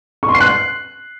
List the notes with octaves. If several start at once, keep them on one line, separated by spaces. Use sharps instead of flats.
C#6
C6
C7
F#6